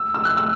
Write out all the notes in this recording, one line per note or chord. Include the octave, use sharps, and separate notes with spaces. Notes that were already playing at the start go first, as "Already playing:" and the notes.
Already playing: E6
E6
F#6
E6